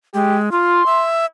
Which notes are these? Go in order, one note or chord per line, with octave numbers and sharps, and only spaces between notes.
G#3 G4
F4 C6
E5